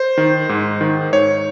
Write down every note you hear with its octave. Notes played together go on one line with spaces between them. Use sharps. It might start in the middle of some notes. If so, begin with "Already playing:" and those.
Already playing: C5
D#3
G#2
D#3
G#2 C#5